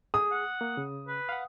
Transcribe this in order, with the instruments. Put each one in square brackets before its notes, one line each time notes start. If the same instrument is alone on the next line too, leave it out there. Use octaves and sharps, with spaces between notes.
[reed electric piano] G#4 [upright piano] D#6
[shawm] F#5
[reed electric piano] A#3
C#3
[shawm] B4
[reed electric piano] F5 F#5